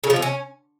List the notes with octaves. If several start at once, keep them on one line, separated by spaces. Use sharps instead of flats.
C#3
F3
C3
C#4